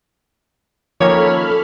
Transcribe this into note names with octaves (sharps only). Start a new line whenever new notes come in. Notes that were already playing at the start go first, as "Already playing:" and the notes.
D#3 F3 A#3 C#4 A4 C#5 B5 F6